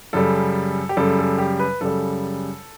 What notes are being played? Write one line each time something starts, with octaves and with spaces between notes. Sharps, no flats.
F#2 C#3 G3 A4
G4
F#2 C#3 G3 A4
A4
G4
B4
F#2 C#3 G3 A4